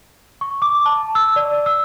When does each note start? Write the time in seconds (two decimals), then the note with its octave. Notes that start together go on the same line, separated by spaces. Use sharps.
0.41 C#6
0.62 D6
0.86 A5
1.15 E6
1.36 D5
1.66 E6